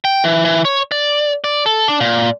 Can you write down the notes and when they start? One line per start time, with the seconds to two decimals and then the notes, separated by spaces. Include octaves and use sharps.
0.05 G5
0.24 E3
0.45 E3
0.65 C#5
0.92 D5
1.44 D5
1.66 A4
1.88 D4
2.01 A#2